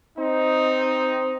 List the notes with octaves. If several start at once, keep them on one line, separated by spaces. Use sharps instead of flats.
C4 D#4